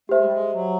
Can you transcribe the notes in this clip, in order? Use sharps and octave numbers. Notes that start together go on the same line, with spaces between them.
A3 G4 C5 E5
G#3
G3
G#3
F#3